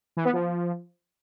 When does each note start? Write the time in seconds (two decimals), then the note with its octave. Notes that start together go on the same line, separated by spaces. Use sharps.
0.17 E3
0.25 B3
0.33 F3